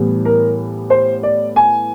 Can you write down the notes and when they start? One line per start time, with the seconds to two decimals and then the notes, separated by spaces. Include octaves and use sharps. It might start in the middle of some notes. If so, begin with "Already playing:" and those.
Already playing: A2 E3 G3 B3
0.25 A#4
0.90 C5
1.23 D5
1.56 G#5